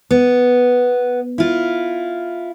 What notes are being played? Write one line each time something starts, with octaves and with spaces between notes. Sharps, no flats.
B3
E4 F4